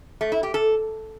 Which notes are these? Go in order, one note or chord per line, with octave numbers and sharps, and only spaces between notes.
A3
E4
G4
A4